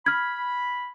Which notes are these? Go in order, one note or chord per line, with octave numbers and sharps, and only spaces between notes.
B5 F6 G#6